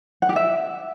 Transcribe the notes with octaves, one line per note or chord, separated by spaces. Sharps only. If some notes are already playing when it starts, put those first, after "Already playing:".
F#5
G4
E5